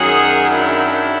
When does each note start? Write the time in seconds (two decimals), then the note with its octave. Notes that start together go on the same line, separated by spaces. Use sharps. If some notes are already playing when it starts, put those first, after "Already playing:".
Already playing: F#2 D#3 F#3 F#4 G#4
0.48 D4 E4